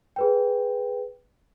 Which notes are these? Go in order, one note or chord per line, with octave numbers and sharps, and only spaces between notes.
G#4 B4 G5